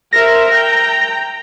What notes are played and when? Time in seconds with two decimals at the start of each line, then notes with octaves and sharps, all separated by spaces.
0.13 A#4 C5 E5 A#6
0.53 G5 A#5